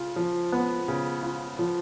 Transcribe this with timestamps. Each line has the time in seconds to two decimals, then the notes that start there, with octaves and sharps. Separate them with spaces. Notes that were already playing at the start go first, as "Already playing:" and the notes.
Already playing: C#3 F4
0.16 F3
0.52 B3
0.88 C#3
1.23 F4
1.59 F3